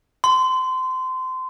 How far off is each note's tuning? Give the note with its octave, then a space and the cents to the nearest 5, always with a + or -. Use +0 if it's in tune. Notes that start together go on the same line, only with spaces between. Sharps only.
C6 -25